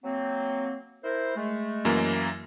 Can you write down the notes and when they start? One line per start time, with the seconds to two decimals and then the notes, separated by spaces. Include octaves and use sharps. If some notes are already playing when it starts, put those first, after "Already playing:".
0.04 F#3 A#3 C4
1.04 E4 A#4 C5
1.37 G#3 A3
1.85 F#2 E3 A#3